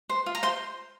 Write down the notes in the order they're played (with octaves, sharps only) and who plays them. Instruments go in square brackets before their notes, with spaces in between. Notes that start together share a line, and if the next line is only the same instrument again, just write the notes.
[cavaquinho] C5
F4
A#5
C5 C6